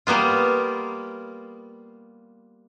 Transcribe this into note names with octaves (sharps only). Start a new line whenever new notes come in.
G3 A#3 B3 F4